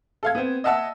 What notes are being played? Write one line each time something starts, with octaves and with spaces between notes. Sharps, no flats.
A4 F5 G#6
B3 C4
D#5 E5 F#5 A5 E6